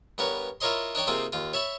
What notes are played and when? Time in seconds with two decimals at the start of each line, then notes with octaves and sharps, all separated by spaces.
0.18 G2 B3 A#4 C#5
0.60 E4 F4 A#4 C#5 D#5 C6
0.95 D4 D#4 C#5 G5
1.07 C3 A#3 C4 D#4 F4 G#4
1.33 D#2 F4
1.53 C#5 E5 A5 B5